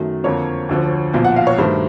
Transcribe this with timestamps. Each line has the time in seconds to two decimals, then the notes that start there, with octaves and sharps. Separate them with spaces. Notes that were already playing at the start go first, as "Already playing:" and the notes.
Already playing: F#2 D#3 F#3 A3
0.24 F2 D3 F3 A#3 C#5
0.69 D2 D3 F3
1.13 B1 A#2 F3 C5
1.25 F#5
1.36 F5
1.47 C#5
1.58 G2 D#3 F#3 A3 C5